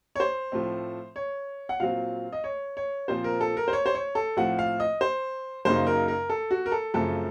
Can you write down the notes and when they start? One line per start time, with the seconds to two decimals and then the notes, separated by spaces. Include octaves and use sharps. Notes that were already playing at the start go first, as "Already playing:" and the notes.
0.16 C#5
0.20 C5
0.52 A2 F3 A3 C4
1.16 C#5
1.69 F#5
1.80 A#2 F#3 C4 F4 F5
2.32 D#5
2.44 C#5
2.77 C#5
3.08 A#2 F3 C4 F4 C5
3.24 A#4
3.41 A4
3.57 A#4
3.68 C5
3.73 C#5
3.86 C5
3.95 C#5
4.15 A4
4.37 A2 F3 C4 F4 F#5
4.59 F5
4.80 D#5
5.01 C5
5.65 F#2 C#3 F#3 A#3 D#4 C5
5.87 A#4
6.08 A#4
6.29 A4
6.51 F#4
6.66 A#4
6.72 A4
6.94 F#2 C#3 F3 A3 C4 A4